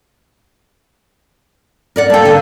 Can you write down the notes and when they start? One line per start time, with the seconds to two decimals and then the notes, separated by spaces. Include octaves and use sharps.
1.96 A#4 D5 F#5
2.10 G3 A#3 A4 G5
2.25 D3